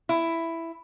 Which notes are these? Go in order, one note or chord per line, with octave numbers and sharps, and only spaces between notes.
E4